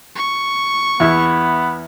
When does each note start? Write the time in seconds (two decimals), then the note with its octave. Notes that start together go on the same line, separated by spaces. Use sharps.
0.15 C#6
1.00 E2 B3 E4